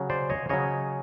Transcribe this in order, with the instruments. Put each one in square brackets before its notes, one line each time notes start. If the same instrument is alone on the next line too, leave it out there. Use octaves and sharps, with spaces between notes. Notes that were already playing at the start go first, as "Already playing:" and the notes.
Already playing: [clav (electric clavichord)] C#3 F#3
C5 D5
C#5 D#5
C#3 F#3 C#5 D#5